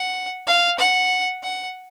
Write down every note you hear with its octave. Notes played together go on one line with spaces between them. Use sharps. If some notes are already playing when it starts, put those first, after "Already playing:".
Already playing: F#5
F5
F#5
F#5